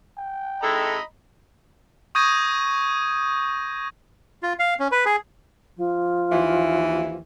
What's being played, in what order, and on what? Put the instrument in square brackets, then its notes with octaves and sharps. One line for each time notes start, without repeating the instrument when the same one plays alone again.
[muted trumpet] G5
[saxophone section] G#3 E4 A4 [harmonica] D#5 A#5 B5
[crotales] C#6 D#6 G6 G#6 A#6 D#7
[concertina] F4
F5
C#4
B4
G#4
[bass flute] F3
[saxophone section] D#2 E3